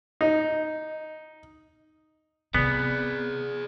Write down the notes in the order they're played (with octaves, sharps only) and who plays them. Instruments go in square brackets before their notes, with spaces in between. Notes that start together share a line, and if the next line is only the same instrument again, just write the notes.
[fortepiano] D#4
[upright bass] C3 [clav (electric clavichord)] B3 [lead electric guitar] G#4 D5